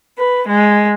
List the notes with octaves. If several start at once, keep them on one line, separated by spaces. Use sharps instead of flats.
B4
G#3